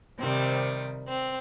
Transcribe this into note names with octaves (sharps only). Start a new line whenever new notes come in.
C3 D#3 G3 C4
C4